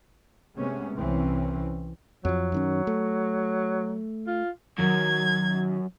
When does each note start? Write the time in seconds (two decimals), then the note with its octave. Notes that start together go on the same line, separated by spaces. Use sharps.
0.57 C3 G#3 A3 B3 C#4
0.97 C2 E3 C4 C#4
2.25 F2 F3 F#3
2.52 F#2 D#3 C#4
2.87 A3
4.27 F4
4.79 F#2 D#3 F#3 G#6